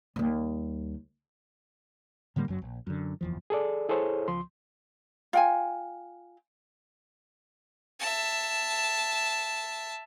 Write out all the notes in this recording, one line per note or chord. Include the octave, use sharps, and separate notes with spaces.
D#2 G3
A2 D3 G3 A#3
F#1 F#2 F#3
A#1
F#2 D3
F#1 E2 F3
G#4 A4 D5
E4 G#4 A4 C5 C#5
C#2 F3 C6
F4 G5 G#5
E5 A5